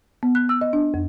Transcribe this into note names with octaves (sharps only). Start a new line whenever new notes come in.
B3
F#6
E6
D#5
D4
F2